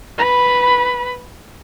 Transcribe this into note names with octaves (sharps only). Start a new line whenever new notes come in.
B4 B5